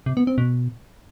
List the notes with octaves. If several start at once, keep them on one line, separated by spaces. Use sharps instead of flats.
C3
B3
C4
B2